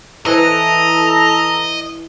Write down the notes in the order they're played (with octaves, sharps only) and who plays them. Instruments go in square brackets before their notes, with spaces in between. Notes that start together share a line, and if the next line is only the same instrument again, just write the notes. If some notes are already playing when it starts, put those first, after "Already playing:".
[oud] E3 [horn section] A4 A#5 [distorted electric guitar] D#5